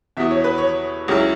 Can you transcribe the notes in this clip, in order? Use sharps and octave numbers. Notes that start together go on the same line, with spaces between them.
E2 B2 B3 E4 E5
C#5
B4
C#5
C#2 C#3 F#3 E4